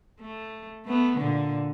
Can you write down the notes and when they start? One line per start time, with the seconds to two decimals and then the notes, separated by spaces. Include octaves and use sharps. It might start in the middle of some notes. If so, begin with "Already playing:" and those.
0.20 A3
0.85 A3 B3
1.16 A#2 D3